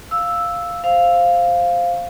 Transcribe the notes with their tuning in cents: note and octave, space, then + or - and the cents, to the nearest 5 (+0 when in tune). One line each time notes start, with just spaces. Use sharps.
F5 +0 E6 +0
C5 +0 F5 +0